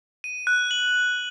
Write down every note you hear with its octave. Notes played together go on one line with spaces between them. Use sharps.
D#7
F#6
F#7